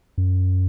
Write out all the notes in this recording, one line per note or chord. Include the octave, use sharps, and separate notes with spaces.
F#2